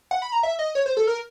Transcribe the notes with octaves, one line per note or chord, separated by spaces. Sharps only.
F#5
B5
A#5
E5
D#5
C#5
C5
A4
A#4